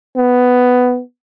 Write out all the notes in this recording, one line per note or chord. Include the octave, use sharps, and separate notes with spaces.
B3